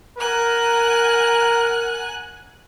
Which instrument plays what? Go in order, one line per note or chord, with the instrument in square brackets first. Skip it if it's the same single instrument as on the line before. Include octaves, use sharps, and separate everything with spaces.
[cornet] A#4 [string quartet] F#5 G#5 F#6